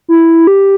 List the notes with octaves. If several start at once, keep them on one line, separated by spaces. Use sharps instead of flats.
E4
G4